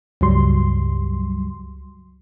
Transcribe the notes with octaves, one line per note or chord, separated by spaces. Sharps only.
C#2 G2 F#3 G3 C6